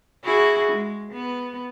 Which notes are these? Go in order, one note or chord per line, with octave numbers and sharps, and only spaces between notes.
E4 F#4 G#4
G#3
B3